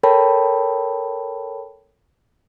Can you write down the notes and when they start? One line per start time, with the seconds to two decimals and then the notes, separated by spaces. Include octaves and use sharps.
0.03 A4 A#4 C#5 G5 A5 B5